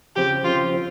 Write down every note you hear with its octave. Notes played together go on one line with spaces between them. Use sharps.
C#3 F3 C4 G4
C#3 F3 C4 F4
F3 C4